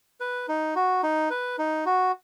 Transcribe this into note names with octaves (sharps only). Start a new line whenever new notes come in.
B4
D#4
F#4
D#4
B4
D#4
F#4